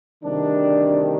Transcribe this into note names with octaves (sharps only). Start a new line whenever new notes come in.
D2 C3 D#3 G3 D4